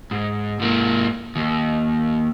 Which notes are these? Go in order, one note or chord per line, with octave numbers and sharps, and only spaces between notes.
G#2
G#2 A#3
D#2